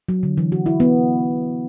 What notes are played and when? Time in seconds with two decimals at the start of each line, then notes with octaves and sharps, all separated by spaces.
0.09 F#3
0.23 D3
0.37 E3
0.52 F#4
0.66 E4
0.80 B3